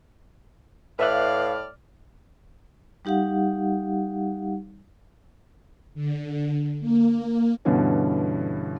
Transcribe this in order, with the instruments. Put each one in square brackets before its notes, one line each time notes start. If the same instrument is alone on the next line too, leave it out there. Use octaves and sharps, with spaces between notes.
[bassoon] A2 [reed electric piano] B4 E5 F#6 [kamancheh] D5 F6 [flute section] F5
[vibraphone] G3 D#4 G4 F5 F#5
[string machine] D3
A#3
[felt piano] G2 B2 D3 E3 C#4